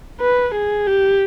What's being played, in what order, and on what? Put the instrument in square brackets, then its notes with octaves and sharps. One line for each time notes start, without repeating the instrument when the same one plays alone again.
[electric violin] B4
G#4
G4